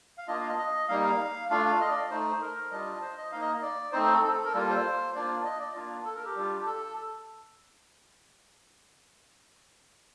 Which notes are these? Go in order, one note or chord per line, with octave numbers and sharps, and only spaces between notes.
F5
A#3 D4 F4 D#5
F5
D#5
D#5
G3 A#3 D#4 F5
F5
A3 D4 F4 F5
F5
D#5
D5
A3 D#4 C5
C5
A#4
G3 D4 F4 D#5
C5
D#5
A#3 D#4 F5
D#5
D5
A3 C4 D#4 C5
C5
A4
A4
A#4
G3 A#3 F4 A4
C5
A#3 D4 F4 D5
D#5
D5
A#3 D4 F4
A4
A#4
G4
G3 D4 F4
G4
A4